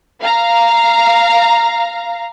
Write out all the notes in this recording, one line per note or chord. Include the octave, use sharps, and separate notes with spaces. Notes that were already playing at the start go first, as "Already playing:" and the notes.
F5 A#5